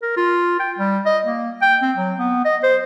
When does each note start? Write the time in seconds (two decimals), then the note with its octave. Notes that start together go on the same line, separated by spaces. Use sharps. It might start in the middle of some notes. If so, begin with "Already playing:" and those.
0.02 A#4
0.17 F4
0.60 G5
0.78 G3
1.06 D#5
1.26 A#3
1.62 G5
1.82 C4
1.97 F#3
2.19 B3
2.45 D#5
2.63 C5